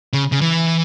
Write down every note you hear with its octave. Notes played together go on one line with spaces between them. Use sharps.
C#3
C#3
E3